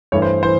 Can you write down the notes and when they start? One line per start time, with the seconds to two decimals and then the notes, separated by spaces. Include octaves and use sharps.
0.12 G2 E3 A3 C#5
0.22 C5
0.43 E3 C5